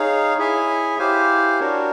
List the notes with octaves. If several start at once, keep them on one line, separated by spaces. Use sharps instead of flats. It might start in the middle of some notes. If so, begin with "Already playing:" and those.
Already playing: D#4 G#4 C#5 F5
E4 G#4 C#5 E5 G#5
E4 G4 C5 F5 G#5
D4 F#4 A#4 C#5